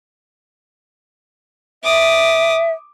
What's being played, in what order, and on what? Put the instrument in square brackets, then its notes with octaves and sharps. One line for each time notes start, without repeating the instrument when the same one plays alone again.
[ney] E5 [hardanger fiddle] D6 D#6